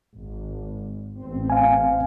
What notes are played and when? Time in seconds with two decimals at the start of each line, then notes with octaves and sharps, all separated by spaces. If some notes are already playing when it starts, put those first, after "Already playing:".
0.15 G#1
1.20 A1 C4
1.50 F5 G#5